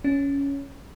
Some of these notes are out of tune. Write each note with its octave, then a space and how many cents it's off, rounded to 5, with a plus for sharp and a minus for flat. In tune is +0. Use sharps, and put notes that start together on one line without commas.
C#4 +10